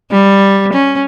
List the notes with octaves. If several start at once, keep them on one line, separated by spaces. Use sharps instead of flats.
G3
C#4